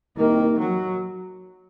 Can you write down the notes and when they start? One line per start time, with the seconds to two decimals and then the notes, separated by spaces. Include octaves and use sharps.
0.16 C2 C3 D#3 A#3
0.58 F#3